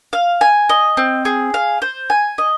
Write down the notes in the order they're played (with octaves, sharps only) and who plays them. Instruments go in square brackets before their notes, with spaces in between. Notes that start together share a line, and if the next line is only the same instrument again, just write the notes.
[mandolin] F5
G#5
D#5
C4
G#4
F5
C5
G#5
D#5